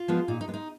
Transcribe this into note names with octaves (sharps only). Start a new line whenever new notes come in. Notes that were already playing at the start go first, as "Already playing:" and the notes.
Already playing: F4
F3 G#3 B3
A#2 D#4
D#4
G#3 B3
D#4